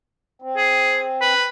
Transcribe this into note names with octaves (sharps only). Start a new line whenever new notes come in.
C4
G#4
B4